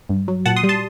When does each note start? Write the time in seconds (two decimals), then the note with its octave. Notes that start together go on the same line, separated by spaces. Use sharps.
0.09 G2
0.28 F#3
0.46 A#2 F#5 A5
0.56 C6 D#6
0.64 G3
0.69 A5 C6